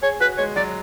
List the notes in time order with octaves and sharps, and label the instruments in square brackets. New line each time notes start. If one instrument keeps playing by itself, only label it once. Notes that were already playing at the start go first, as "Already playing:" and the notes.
[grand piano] G#4 [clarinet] C#5
[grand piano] F#4 [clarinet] B4
[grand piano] G#3 [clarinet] C#5
[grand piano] F#3 [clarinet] D5